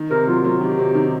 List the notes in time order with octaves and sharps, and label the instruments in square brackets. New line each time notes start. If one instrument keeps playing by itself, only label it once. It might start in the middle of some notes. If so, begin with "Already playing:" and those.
Already playing: [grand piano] D#3
[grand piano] C3 [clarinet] A#4
[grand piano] F#3 [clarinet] F4
[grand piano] F#3 [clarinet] F4
[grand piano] D#3 [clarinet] G4
[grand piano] C3
D#3